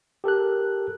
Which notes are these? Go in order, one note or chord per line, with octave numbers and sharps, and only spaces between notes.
G4 A4 A#4 F#6